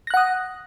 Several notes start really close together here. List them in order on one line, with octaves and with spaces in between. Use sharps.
A#6 F#6 F#5 D#6